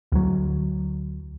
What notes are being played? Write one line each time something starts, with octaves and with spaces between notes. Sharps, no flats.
D2 F#3